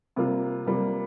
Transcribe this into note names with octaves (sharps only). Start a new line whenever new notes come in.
C3 G3 A#3 F4
C3 G3 A#3 F4